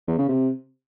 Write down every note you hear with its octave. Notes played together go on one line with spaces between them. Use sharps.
E2
C#3
C3